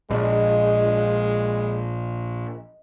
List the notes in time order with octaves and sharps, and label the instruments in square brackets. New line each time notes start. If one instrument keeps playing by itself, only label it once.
[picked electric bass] A#1 [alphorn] G#3 [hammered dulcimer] D#5